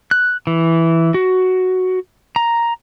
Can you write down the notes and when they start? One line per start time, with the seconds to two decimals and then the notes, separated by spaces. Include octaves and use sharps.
0.11 F#6
0.47 E3
1.14 F#4
2.36 A#5